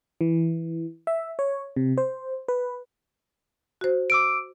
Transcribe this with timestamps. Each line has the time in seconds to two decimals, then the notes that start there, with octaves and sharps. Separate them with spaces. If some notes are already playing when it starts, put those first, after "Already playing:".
0.21 E3
1.07 E5
1.39 C#5
1.76 C3
1.98 C5
2.48 B4
3.81 F#4 C5
4.10 D6 E6 D7